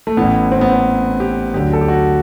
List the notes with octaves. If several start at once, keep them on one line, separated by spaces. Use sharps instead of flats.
A3
A1 A2 E3 B3
C4
B3
C4
G4
D2 D3 F#3 G4
A4
G4
F#4